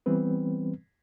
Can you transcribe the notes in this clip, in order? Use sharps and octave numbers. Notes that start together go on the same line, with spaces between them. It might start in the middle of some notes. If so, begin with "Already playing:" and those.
E3 G3 B3 C4 B4